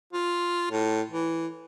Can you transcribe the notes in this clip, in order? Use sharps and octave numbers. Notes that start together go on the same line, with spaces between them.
F4
A2
E3